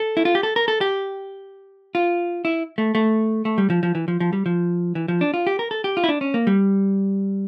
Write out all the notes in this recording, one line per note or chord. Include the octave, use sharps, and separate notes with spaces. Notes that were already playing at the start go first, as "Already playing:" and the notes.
Already playing: A4
E4
F4
G4
A4
A#4
A4
G4
F4
E4
A3
A3
A3
G3
F3
F3
E3
F3
F3
G3
F3
E3
F3
D4
F4
G4
A#4
A4
G4
F4
E4
D4
C#4
A#3
G3